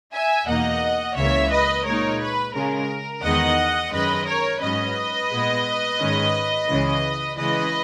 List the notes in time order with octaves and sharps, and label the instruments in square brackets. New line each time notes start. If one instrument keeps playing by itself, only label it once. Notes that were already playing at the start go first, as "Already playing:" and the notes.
[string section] E5 G#5
E2 B2 A#3 D#4 D#5 F#5
C#2 C#3 E3 A#3 C#5 E5
B4 D#5
A#2 G#3 D#4 A#4 C#5
B4
C#3 G#3 C#4 A#4
E2 D#3 G#3 B3 D#4 D#5 F#5
F#2 D#3 G#3 C#4 B4 D#5
A#4 C#5
G#2 F#3 C#4 B4 D#5
A#2 G#3 B3
G#2 D#3 G#3 C#4
C#2 C#3 E3 G#3
C#3 E3 G#3 B4 D#5